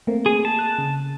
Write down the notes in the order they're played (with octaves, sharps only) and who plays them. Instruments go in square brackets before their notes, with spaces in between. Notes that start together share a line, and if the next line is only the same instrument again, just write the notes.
[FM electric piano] A3 A#3 C4
[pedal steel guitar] G#4
A5
[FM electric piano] F#6
C#3